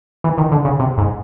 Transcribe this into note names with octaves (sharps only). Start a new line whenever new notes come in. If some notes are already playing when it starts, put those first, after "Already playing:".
E3
D#3
D3
C#3
C3
G#2